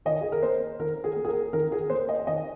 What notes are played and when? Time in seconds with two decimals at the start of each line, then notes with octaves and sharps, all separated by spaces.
0.05 D#3 D#5
0.21 G#4
0.32 A#4
0.43 A#3 C5
0.79 D#3 A#4
1.04 G#4
1.16 A#3
1.25 G#4
1.28 A#4
1.53 D#3 A#4
1.72 G#4
1.90 A#3 C5
2.09 D#5
2.27 D#3 D#5